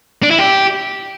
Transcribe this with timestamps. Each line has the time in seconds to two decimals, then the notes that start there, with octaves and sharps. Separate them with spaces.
0.23 D4
0.31 E4
0.39 G4